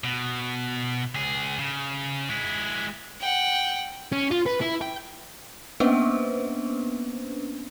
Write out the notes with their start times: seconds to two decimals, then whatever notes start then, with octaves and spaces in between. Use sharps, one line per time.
0.04 B2
1.15 C#2 G#4
1.59 C#3
2.29 G#3 E4
3.20 F#5 G5
4.12 C#4
4.31 F4
4.47 B4
4.62 E4
4.82 G5
5.80 A#3 B3 C#4 D4 B4 C5